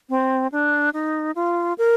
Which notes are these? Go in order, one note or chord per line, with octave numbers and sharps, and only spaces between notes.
C4
D4
D#4
F4
A#4